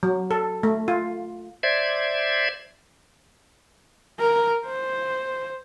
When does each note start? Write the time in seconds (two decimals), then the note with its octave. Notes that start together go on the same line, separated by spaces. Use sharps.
0.03 F#3
0.31 A4
0.63 A3
0.88 F4
1.63 C5 D5 E5 G#6
4.19 A#4
4.65 C5